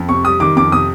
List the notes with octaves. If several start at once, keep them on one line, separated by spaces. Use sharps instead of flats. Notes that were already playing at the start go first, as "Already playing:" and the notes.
Already playing: F2
C3 C#6
G3 D#6
D#3 D6
F2 D6
C3 D#6